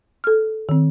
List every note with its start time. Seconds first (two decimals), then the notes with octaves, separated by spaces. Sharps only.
0.24 A4 F6
0.69 D#3 C4